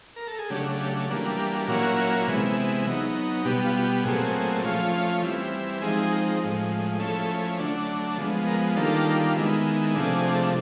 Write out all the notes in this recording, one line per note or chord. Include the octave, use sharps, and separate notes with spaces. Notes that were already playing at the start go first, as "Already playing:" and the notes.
A#4
A4
G#4
C#3 F#3 A3 D4 G4
G4
E3 G3 A#3 D4 F#4
F#4
G4
F#4
A#2 F#3 A#3 C#4 E4 F#4
C3 E3 G#3 B3 E4
F#3 B3 D#4
B2 G3 B3 G4
F4
G4
A#2 F#3 A3 C4 G#4
F3 A3 C#4 F4
E3 G3 C4 E4
F3 G#3 C4 D#4 G#4
A2 F3 G#3
F3 A3 C#4 E4 A4
D3 F#3 A3 D4
F3 G#3 B3
A#4
D#3 G3 A#3 D4 F4 A4
D#3 G#3 B3 E4
C3 F3 A3 D4 G#4